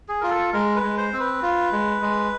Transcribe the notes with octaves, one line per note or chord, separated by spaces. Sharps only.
G#4
F4 A#4
A4
G#3 A#4
B4
G#3
C5
C4
B4
F4
G#3
G#3